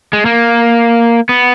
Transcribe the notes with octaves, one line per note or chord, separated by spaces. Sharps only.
G#3
A#3
B3